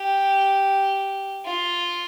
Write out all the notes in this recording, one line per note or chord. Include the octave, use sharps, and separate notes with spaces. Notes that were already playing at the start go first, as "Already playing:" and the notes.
Already playing: G4
F4